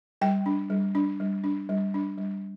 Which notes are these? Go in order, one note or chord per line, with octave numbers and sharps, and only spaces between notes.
G3 G5
D4
G3
D4
G3
D4
G3
D4
G3